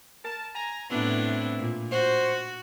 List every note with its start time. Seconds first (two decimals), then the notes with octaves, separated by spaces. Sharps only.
0.24 A#4 A5
0.54 G#5 A#5
0.90 A2 B3 C4 D4 E4
1.59 A#2
1.92 F#4 C5